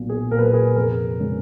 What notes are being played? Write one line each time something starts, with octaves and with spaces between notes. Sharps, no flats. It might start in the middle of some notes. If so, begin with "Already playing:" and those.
Already playing: B1 A#2 F#3
G#4
A#2 F#3 A#4
B4
A#4
G#4
F1 A#4
C#3 G#3 C#4